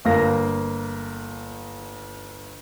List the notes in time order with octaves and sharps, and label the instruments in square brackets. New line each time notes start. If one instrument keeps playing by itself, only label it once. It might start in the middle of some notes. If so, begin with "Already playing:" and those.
[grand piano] G1 A#3 F5 A#6